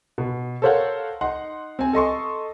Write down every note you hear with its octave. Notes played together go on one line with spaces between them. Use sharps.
B2
A4 A#4 C5 C#5 F5 F#5
D#4 F#5 C6
C4 G#5
A4 D#5 C6 C#6